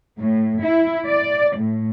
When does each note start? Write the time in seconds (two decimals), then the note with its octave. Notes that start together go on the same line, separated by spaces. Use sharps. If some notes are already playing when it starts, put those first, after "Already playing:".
0.19 A2
0.62 E4
1.06 D5
1.57 A2